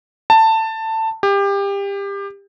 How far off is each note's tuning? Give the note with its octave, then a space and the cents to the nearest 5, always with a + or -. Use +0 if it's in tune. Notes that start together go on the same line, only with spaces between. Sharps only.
A5 +15
G4 +25